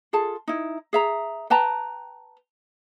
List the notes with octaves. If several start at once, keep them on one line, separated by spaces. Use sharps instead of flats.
F4 G#4 A4 A5
D#4 E4
G#4 E5 A#5
B4 G5 A5 A#5